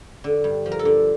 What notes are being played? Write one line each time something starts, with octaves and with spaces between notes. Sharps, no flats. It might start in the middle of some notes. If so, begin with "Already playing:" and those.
D3
G2
F3
A#4
A4
D3